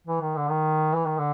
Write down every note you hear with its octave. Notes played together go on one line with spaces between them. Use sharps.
E3
D#3
D3
D#3
E3
D#3
D3